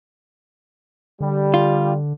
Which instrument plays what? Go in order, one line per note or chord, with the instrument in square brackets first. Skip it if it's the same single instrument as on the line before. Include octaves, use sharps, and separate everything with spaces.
[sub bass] D3 [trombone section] G3
[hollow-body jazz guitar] F4